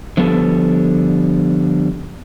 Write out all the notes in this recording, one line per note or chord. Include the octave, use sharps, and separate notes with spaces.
D3 F3 G3 B3 A4